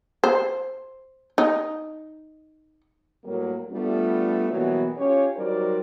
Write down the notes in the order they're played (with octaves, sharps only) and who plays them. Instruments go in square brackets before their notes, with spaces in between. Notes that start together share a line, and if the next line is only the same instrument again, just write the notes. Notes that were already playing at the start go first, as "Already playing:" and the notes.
[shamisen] C5
D#4
[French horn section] A2 F#3 G3 A#3
G3 A3 B3 D4 F4
B2 E3 F#3 G3 A#3 B3
C#4 F4 G4 C#5
F#3 G3 D#4 A#4 C5 D5